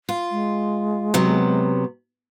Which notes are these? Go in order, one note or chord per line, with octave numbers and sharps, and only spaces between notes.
F4
G#3
C3 F#3 B3